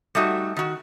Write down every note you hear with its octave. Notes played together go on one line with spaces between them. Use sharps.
G3 A3 D#4 F#4
D#3 F#4